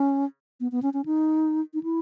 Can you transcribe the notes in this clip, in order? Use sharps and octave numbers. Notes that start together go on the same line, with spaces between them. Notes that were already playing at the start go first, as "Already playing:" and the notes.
Already playing: C#4
B3
B3
C#4
C#4
D#4
D#4
E4